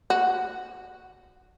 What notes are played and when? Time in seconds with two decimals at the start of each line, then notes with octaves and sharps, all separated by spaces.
0.10 F#4